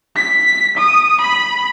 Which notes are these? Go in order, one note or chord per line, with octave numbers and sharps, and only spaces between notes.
B6
D#6
B5